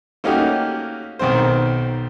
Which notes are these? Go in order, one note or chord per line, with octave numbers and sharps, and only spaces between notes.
A3 A#3 C#4 D#4 F#4 G4
B1 D#3 C4 C5